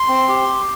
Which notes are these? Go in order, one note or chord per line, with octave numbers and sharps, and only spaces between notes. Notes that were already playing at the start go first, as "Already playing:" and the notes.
Already playing: C6
C4
G4